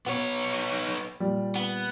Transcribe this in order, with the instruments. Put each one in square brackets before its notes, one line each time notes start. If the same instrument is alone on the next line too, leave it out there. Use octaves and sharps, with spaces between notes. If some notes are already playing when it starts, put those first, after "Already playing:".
[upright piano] B2 [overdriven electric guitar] B3 C#5
[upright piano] A#2 G3
[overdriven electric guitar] B3